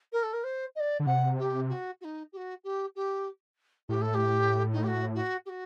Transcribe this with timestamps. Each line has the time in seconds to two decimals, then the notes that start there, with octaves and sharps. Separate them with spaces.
0.12 A#4
0.23 A4
0.33 A#4
0.44 C5
0.75 D#5
0.80 D5
1.00 D3
1.06 C3 F#5
1.38 G4
1.69 F#4
2.01 F#4
2.04 D#4
2.32 G4
2.37 F#4
2.64 G4
2.95 G4
3.89 A2 G4
4.01 A4
4.14 G4
4.72 D#4
4.83 G4
4.87 F#4
5.15 F#4
5.46 G4
5.49 F#4